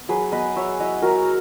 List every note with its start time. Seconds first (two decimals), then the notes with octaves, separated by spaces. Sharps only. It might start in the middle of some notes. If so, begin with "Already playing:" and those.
Already playing: B3
0.09 F#3 G#4 B4
0.32 B3 B4 D#5
0.56 F#3 C#5 E5
0.79 E4 D#5 F#5
1.02 F#3 F#4 A#4